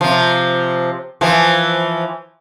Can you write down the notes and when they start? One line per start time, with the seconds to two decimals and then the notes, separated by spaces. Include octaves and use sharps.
0.01 C3 F3
1.21 E3 F3